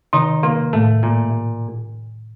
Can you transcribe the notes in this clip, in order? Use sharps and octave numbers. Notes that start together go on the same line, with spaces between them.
C3 D#3 D#4
C3 A#3
A2 A3
A#2